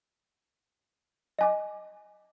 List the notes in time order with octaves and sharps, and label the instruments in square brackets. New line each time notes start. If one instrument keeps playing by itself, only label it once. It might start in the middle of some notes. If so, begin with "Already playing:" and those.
[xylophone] D#5 G#5 D6